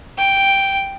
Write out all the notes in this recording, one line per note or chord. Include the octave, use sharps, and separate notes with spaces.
G5